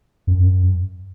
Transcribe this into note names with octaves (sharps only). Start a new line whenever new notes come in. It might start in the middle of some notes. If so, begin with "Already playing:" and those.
F#2